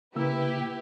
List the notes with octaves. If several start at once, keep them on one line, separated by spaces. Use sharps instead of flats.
C#3 A#3 E4 G4 B4 E6